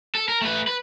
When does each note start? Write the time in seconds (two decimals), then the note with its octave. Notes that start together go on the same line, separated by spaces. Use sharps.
0.15 A4
0.28 A#4
0.42 A3 B4
0.67 B4